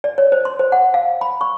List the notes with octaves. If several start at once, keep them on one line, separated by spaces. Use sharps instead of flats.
D5
C#5
C5
C6
C5
F#5
F5
B5
C#6